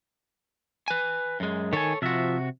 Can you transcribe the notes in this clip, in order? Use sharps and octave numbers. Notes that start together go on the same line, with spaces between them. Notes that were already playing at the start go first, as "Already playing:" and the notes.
B4 G#5
F#2 G#3
D#3 A4 C#5 G#5
C3 F3 F4 F#4 E5